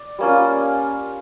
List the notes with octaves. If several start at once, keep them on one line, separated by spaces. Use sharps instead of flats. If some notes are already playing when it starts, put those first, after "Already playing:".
Already playing: D5
G3 A#3 C#4 F4